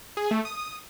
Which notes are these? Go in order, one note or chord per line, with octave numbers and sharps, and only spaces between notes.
G#4
A3
D#6